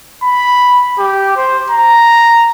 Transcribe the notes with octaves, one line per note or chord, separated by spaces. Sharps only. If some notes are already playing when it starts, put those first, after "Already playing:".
B5
G4
C5
A#5